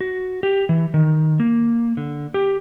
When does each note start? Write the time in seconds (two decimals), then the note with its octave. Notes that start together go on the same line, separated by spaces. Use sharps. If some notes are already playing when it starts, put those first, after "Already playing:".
0.01 F#4
0.43 G4
0.69 E3
0.94 D#3
1.40 A#3
1.97 D3
2.34 G4